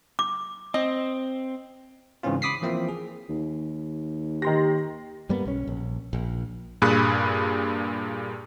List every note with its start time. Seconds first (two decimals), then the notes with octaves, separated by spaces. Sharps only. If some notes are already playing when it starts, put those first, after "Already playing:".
0.19 D6
0.74 C4 D#5
2.23 G#2 C#3 E3 C4 C#4 F4
2.42 B5 D6 D#6 B6 C7
2.62 E3 F3 A#3 C4 E4 F4
2.89 G#4
3.29 D#2
4.42 D#3 G4 C6 A#6
5.29 G2 G3 A#3 B3
5.45 B1 C#4
5.67 A#1
6.13 A#1
6.82 G2 A#2 G#4 B5 F#6